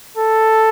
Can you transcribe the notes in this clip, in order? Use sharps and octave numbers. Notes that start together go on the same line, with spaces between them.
A4